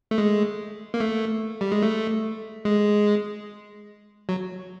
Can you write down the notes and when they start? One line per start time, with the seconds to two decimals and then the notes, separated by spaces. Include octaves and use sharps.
0.11 A3
0.18 G#3
0.94 A#3
1.00 A3
1.61 G3
1.72 G#3
1.82 A3
2.65 G#3
4.29 F#3